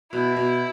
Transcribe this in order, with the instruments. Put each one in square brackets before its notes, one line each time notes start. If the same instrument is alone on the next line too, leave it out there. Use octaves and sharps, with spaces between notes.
[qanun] B2 [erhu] E4
[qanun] B2